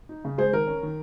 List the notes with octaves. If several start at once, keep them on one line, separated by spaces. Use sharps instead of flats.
D#4
C#3
G#3 G#4 C5
D#3 A#4
C#4
D#3